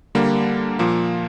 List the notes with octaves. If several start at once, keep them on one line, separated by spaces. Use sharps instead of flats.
D3 G3 A#3
A#2 F3 A#3